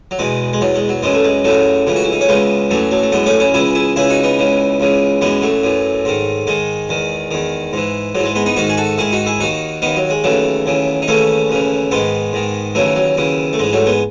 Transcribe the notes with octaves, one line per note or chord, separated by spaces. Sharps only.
F#3
E2 B2 G#3
G#3
E2 B2 F#3
G#3
F#3
F#2 C#3 E3 G#3
A3
G#3
F#2 C#3 E3 F#3 A3
C#2 C#3 E3
F#4
E4
D#4
C#4
C#2 C#3 E3 G#3 B3
F#2 E3 F#3 A3
F#3 A3
A3
F#2 E3 G#3 B3
A3 C#4
C#4 E4
C#2 C#3 E3 E4 G#4
E4 G#4
C#2 C#3 E3 E4 G#4
D#4 F#4
B3 D#4
C#2 C#3 E3
C#2 C#3 E3
F#2 E3 G#3 B3
F#3 A3
F#2 E3
G#2 D#3
G#2 D#3 G#3
E2 D#3
E2 D#3
G#2 E3
G#2 E3 F#3
G#3
G#3 B3
B3 D#4
G#2 D#3 D#4 F#4
G#4
F#4 A4
G#2 D#3 E4 G#4
D#4 F#4
E4 G#4
D#2 D#3 D#4 F#4
D#2 D#3 B3 D#4
F#3
G#3
D#2 C#3 E3 F#3 A3
D#2 C#3 E3
D#4
D#2 C#3 E3 A3 C#4
D#2 C#3 E3
G#2 D#3 G#3 B3
G#2 D#3
D#2 C#3 E3 F#3 A3
F#3
D#2 C#3 E3
A3
G#2 E3 G#3
F#3 A3
G#3 B3